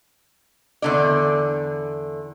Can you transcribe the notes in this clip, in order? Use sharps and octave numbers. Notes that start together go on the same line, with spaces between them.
E2 D3 D5